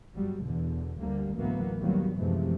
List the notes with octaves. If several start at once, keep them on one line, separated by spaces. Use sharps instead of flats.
G1 F#3 G3
E2 B2 D3
D2 D3 G3 A#3
A1 D2 E3 F#3 A#3 B3
D#3 F#3 G3 A#3 B3
F#2 C3 E3 F3 G#3 A3